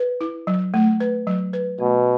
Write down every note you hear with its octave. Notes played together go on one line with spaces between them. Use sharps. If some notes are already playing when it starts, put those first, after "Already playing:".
Already playing: B4
E4
F#3
A3
B4
F#3
B4
B2 A3